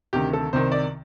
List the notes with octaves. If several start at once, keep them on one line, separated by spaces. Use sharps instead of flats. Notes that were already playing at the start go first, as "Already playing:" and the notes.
D2 C3 D#3 G4
A4
C2 C3 D#3 C5
D5